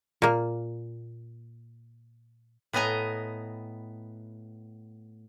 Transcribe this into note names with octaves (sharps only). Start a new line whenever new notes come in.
A#2 A#3
A2 B3 D#5 G#5 A#5